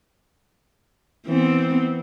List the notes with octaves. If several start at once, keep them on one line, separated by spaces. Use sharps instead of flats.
E3 B3 C4